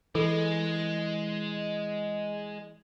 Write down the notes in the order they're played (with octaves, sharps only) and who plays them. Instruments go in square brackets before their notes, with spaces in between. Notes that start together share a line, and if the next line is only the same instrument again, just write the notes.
[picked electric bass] E3 [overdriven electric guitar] G#3 [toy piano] A4